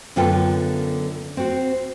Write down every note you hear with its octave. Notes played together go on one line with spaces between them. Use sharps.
F#2 D3 B3 F4 A4 G5
C4 F#4